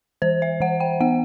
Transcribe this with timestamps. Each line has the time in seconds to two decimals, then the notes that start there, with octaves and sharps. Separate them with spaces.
0.22 E3 C5
0.42 E5
0.60 E3 F#5
0.80 G5
1.01 B3 F#5